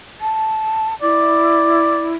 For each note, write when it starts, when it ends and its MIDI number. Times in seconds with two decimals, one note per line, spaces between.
0.21 0.94 81
1.02 2.15 64
1.02 2.11 74